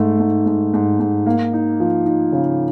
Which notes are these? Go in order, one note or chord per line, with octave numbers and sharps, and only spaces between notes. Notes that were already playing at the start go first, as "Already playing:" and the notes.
Already playing: G#2 A3
G#2
G#2
G#2
G#2
A#3
D#4
F3
D#4
C#3